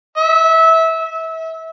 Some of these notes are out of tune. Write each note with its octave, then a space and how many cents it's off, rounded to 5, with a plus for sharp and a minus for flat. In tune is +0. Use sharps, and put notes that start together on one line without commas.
E5 -20
E5 -30